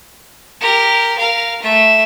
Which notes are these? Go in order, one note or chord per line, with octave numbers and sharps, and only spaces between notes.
G4 A#4
A#4 F5
A3 E5